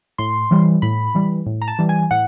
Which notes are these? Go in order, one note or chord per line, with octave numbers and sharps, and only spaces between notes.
A2 C6
E3 G3
A2 B5
E3 G3
A2
A#5
A5
E3 G3
G#5
A2 F#5